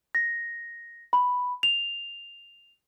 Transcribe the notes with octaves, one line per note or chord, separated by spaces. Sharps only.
A#6
B5
F7